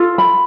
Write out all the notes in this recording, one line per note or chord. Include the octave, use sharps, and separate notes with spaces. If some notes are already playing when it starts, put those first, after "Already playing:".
Already playing: F4 A4
B5